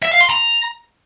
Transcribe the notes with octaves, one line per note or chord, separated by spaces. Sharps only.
E5
F5
C6
A#5